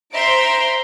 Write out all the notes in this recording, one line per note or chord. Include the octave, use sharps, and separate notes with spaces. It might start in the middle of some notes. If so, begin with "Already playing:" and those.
C5 E5 A#5 C6 D7